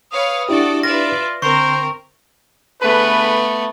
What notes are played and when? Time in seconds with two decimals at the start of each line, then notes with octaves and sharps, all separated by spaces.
0.12 B4 C#5 F5 D#6
0.49 D4 E4 F#4 G4 A4 D5
0.83 F4 B4 D5 E5 A#6
1.42 D3 C4 A#4 C5 C#6
2.82 D3 A3 B3 G#4 B4